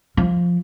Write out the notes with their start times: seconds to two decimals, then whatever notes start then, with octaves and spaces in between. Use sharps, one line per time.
0.17 F3